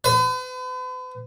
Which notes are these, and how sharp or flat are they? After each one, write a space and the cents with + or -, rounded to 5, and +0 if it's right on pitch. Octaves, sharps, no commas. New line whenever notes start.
B4 +45